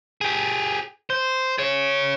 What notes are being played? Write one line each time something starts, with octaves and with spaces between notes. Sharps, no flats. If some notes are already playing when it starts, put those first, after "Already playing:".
G4 G#4
C5
G#4 C#5